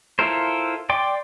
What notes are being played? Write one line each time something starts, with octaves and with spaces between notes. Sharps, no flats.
E4 F4 A4 A#4 C5
D5 G5 C6 D6